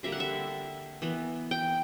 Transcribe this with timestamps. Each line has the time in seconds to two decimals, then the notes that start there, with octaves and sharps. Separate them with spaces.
0.03 D3 G3 A#3 E5
0.12 F#5
0.20 E5
1.02 E3 B3
1.51 G5